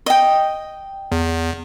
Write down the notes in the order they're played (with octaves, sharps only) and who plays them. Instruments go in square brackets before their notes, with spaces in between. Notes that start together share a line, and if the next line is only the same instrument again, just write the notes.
[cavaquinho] D#5 G5
[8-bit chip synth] E2